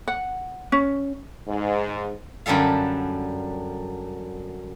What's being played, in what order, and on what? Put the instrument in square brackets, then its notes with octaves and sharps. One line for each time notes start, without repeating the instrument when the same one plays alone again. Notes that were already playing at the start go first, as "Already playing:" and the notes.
[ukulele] F#5
C#4
[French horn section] G#2
[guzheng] F#2 D3 G3 A4 F5